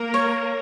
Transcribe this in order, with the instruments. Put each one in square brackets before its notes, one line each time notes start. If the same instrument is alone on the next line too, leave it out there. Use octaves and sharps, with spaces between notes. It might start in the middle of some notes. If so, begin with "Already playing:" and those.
Already playing: [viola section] A#3 A#4
[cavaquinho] C#5